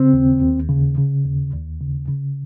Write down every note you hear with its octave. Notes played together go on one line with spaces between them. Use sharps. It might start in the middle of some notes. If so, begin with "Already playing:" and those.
Already playing: C#3 C4
D#2
D#2
C#3
C#3
D#2
D#2
C#3
C#3